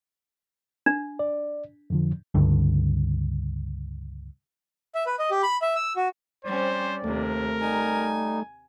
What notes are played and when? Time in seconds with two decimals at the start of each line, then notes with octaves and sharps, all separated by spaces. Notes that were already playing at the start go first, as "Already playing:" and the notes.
0.86 D4
1.19 D5
1.90 F2 D3 F3
2.34 C#2 G2 D3
4.95 E5
5.07 B4
5.19 D#5
5.31 G4
5.43 B5
5.62 E5
5.76 E6
5.96 F#4
6.45 G3 C4 C#4 C5 D5
7.04 D#2 C3 A3 A#4
7.61 G3 D#4 G#5